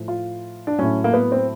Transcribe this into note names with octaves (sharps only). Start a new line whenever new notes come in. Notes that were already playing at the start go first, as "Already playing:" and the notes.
Already playing: A2 F3
F4
D4
A2 F#3 C#4
A#3
B3
C4